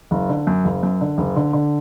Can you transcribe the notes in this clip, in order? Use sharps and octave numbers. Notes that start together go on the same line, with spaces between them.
F#1
D3
F#2
F#1
F#2
D3
F#1
D3
D3